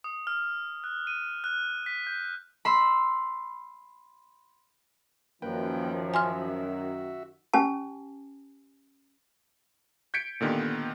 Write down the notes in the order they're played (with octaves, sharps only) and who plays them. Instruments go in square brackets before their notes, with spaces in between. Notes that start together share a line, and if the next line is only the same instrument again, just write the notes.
[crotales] D#6
F6
F#6
D#7
F#6
B6
G6
[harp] B5 C6 E6
[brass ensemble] F#2 D#3 [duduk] F3 [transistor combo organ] A#3 B4 G5
[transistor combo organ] F#4 E5 [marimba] G#5 C6 F6
[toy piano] C#4 G4 G#5 A5
[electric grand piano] G6 G#6 B6 C#7 D7
A#2 D3 D#3 B3 G4